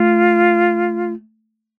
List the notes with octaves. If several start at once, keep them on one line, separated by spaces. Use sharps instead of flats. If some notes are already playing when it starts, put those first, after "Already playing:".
Already playing: A3 F4